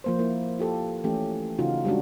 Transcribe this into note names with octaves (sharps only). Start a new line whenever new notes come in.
F3 A#3 C5
A#3 E4
F4 G4 A4
E3 A3 C#4 G4
C#3 E3 D#4 F4 F#4
G3 G#3 C#4 D4 F#4